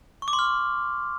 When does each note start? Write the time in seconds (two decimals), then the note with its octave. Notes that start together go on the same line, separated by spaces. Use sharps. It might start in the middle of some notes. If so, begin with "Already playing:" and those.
0.22 C#6
0.28 D6
0.33 C6
0.39 F6